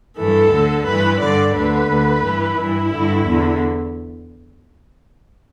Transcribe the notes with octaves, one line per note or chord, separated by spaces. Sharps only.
G2 E3 A4
D2 D3
G2 E3 B4
G2 D3 D5
D2 D3 B4
D2 D3
G2 E3
G2 E3 E4
G2 D3
E2 D3